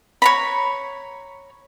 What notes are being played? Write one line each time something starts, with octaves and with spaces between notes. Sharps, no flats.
C#5 A#5 B5